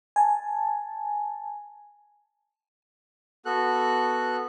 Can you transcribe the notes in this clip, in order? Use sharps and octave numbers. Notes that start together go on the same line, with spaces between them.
G#5 A5
B3 F#4 A4 F#6